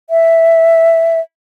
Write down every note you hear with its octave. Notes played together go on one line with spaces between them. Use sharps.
E5